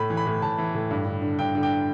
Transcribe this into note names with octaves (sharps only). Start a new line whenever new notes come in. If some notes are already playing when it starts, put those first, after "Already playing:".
Already playing: A2 B5
E3
B5
A2
A2 A5
E3
A2
G2
D3
D3
G2 G5
D3
G5